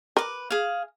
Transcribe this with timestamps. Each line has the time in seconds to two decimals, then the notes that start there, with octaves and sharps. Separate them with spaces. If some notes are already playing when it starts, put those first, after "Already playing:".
0.17 A#4 B4 D6
0.51 G#4 F5